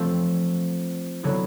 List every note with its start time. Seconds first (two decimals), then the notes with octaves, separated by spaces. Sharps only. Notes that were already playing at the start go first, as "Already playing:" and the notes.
Already playing: F3 A3 C4
1.23 D3 F#3 B3 E4